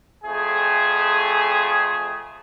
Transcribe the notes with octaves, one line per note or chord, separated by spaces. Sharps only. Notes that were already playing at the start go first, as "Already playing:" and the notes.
F2 A3 G#4